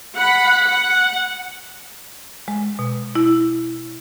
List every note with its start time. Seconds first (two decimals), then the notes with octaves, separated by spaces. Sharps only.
0.17 F#5 B5
0.67 F#5
2.48 G#3
2.79 B2
3.15 E4